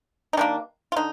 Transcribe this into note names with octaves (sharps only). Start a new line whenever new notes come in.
D#4
D#3 G3 A#3 D4
F4
D3 D#4